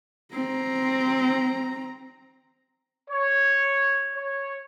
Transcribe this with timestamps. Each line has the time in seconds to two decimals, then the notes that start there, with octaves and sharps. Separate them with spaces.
0.34 C4 A#5
3.10 C#5
4.16 C#5